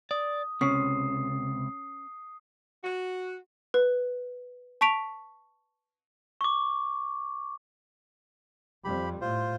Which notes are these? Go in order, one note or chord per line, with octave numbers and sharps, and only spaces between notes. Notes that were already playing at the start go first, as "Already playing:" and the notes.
D5 D#6
C#2 C3 C#4 D#6 C7
F#4
B4
A5 C#6 B6 D7 F7
C#6 D6
F2 G3 G4 B5
A2 F4 C5